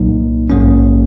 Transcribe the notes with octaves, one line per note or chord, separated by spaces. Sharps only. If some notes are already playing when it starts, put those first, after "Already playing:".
Already playing: C2 A#2 F#3 A#3 D#4
A#1 G#2 F#3 A#3 C#4